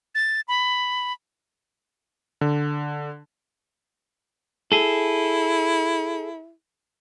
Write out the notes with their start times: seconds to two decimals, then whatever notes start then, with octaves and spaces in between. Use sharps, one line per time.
0.15 A6
0.48 B5
2.41 D3
4.72 E4 G#4 A4